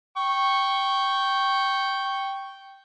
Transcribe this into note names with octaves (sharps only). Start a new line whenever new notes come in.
G5 C#6